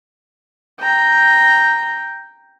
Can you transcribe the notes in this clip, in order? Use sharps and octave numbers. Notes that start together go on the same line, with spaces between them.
G5 A#5